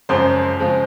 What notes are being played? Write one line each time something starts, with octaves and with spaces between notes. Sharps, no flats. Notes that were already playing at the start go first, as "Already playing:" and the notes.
F#2 C#3 F3 G#3 C5
C#3 F3 G#3